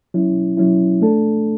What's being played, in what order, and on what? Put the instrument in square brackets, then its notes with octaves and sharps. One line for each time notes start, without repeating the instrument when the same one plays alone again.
[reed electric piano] F#3 C#4 E4
F#3 C#4 E4
A3 D4 A4